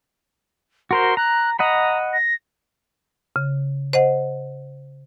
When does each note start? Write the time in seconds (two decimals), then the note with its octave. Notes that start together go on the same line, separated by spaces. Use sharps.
0.91 F#4 A#4 C5 C6
1.17 A#5 F#6
1.59 D#5 F#5 A#5 B5
2.13 A#6
3.36 C#3
3.93 C5 D#5 F#5